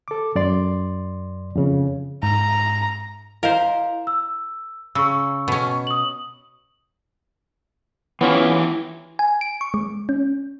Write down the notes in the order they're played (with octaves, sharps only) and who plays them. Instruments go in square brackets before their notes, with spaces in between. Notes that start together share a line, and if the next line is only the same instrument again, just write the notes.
[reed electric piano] A4 D6
F#2 D5 C6
F2 C#3
[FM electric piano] G#2 [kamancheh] A#5
[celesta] E4 D#5 F5 [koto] A#4 C5
[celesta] E6
[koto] C#3 [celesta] C#6 E6
[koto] B2 C#4
[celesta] D#6 F#7
[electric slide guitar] E3 E4 G4 [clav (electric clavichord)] B3 C#4 F4
[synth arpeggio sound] G#5
D7
C#6
G#3
C#4